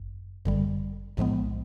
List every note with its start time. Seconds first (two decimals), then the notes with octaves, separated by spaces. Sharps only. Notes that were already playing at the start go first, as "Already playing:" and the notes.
Already playing: G1 F#2
0.45 G1 F#2 D3 G3
1.17 B1 A2 F3 G#3 B3